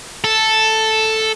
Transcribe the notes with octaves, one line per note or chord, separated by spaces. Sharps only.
A4